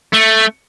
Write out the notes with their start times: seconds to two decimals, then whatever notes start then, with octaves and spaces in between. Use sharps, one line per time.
0.14 A3